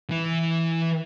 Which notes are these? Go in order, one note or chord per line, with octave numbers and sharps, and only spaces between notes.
E3